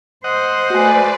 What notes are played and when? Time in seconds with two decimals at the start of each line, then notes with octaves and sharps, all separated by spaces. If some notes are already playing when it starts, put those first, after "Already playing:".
0.24 C5 D#5 F#5
0.70 A3 F#4 B4 D5 G#5